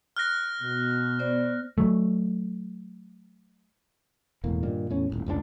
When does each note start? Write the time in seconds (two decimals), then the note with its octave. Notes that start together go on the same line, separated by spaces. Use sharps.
0.16 F6 F#6 A#6
0.61 B2
1.19 B3 C5 D5
1.78 F#3 A3
4.44 E1 E2 A2 A#3
4.63 G2 A#2 D#3
4.90 E2 A2 C#4
5.10 D#1 C2 A2
5.26 F1 C#2 A#2 D4